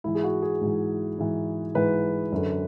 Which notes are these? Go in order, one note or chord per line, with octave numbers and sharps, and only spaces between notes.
G#2 E3 E4
G#4
F#4
G#4
G#2 E3
G#2 E3
G#2 E3 B4
F#2 D3